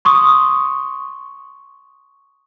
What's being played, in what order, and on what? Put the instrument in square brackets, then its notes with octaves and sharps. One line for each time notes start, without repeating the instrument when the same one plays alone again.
[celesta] C6 C#6 D#6